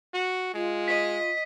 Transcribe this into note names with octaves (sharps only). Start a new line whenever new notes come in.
F#4
G#3 F4
D#5 B6